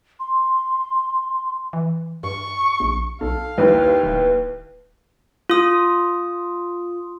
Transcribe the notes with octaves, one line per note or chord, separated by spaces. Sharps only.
C6
E3
G2 C#6
A#1
B1 A4 F5
D#2 E4 B4
D1
F4 D#6